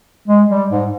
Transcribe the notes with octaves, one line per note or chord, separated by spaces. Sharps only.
G#3
G3
G#2